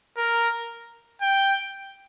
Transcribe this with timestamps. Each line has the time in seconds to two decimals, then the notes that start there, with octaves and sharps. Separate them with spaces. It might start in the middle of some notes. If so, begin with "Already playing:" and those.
0.17 A#4
1.22 G5